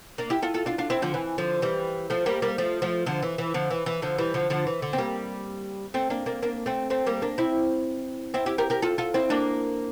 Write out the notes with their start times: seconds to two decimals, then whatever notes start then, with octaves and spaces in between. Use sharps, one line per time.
0.18 A#3 D4
0.30 E4 G4
0.42 F4 A4
0.54 F4 A4
0.66 D4 F4
0.78 D4 F4
0.90 C4 E4
1.02 D3 F3
1.14 E3
1.38 D3 F3
1.62 E3 G3
2.10 F3 A3
2.26 G3 A#3
2.42 G3 A#3
2.58 F3 A3
2.82 F3 A3
3.06 D3 F3
3.22 E3
3.38 E3
3.54 D3 F3
3.70 E3
3.86 E3
4.02 D3 F3
4.18 E3 G3
4.34 D3 F3
4.50 D3 F3
4.67 E3
4.82 D3
4.93 C4
4.98 G3 A#3
5.94 A3 C4
6.10 A#3 D4
6.26 A#3 D4
6.42 A#3 D4
6.66 A3 C4
6.90 A3 C4
7.06 G3 A#3
7.22 A#3 D4
7.38 C4 E4
8.34 C4 E4
8.46 E4 G4
8.58 G4 A#4
8.70 G4 A#4
8.82 F4 A4
8.98 F4 A4
9.14 C4 E4
9.30 A#3 D4